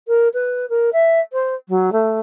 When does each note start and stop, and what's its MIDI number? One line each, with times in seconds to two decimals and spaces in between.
0.08 0.29 70
0.34 0.69 71
0.70 0.90 70
0.93 1.20 76
1.33 1.55 72
1.69 1.90 54
1.92 2.20 57